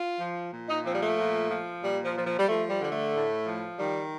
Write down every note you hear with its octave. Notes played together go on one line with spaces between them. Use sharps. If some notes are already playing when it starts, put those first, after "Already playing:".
Already playing: F4
F3
A#2
D#4
F3 C4
G3
A3
A#2
F3
A#2 G3
F3
F3
F3
G3
F3 A3
G3
D3 G3
A3
A2
F3
D#3 G3